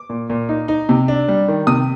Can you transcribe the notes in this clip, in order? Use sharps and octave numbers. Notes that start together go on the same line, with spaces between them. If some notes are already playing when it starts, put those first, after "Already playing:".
Already playing: D6
A#2
A#2
D#4
D#4
C3
D4
G3
D#3
C3 D#6